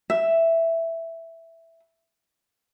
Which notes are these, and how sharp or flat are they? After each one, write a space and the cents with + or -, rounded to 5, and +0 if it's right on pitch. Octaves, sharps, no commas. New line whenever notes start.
E5 +5